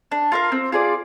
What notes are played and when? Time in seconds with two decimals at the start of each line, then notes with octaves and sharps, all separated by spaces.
0.12 D4
0.32 F4 A#4 F5
0.52 C4
0.72 F4 G#4 D5